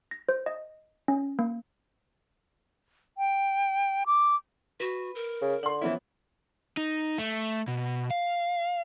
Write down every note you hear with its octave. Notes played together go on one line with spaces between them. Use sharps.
A#6
C5
D#5
C#4
A#3
G5
D6
F#4 B4
A#4
C#3
D3 C6 F#7
E3 F3 A#3 B3 C#4 E4
D#4
A3
B2
F5